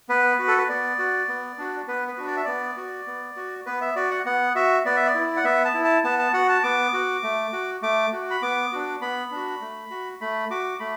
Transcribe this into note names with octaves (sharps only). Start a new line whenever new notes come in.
B3 B4
F#4
A4
B4
B3 D5
F#4
B3
D4 F#4
B3 B4
B4
D4 F#4
D5
E5
B3 D5
F#4
B3
F#4
B3 B4
E5
F#4 D5
F#5
B3 F#5
F#4 E5
B3 D5
E5
D5
E4
F#5
B3 E5
A5
E4
A5
B3 A5
A5
F#4 F#5
A5
B3 D6
F#4
A3
F#4
A3 D6
F#4
B5
B3 D6
D4 F#4
B3 B5
D4 F#4
A3
F#4
A3 B5
F#4 D6
A3 B5